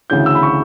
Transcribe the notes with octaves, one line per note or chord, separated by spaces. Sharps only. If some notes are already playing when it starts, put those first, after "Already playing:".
D2 C#3 E3 G6
E6
B5
C#6